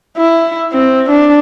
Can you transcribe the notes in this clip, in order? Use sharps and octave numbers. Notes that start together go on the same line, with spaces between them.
E4
C4
D4